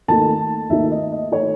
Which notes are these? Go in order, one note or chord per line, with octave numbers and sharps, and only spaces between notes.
D#2 D#3 A3 D#4 A5
D#2 D#3 A3 D#4 E5
D#5
D#5
D#3 A3 D#4 C#5